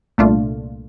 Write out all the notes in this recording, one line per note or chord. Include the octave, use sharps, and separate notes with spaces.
C2 A#2 A3 D4 F4